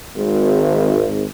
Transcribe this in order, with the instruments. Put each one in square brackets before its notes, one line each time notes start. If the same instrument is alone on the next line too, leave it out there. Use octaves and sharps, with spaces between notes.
[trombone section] G#1